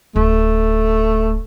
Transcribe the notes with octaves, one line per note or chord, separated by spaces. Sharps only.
D1 A3